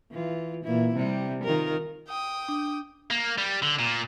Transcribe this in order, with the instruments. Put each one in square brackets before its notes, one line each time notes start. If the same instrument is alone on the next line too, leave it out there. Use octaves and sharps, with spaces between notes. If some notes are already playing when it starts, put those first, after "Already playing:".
[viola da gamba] E3 F4
A#2 E3 E4
C3 G3
D#3 F4 A#4
[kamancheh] G5 D#6
[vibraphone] D4
[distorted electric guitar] A#3
G3
D3
A#2